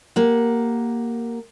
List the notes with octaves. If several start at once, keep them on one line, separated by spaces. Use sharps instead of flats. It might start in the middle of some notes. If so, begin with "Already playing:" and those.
A#3 G4 F#5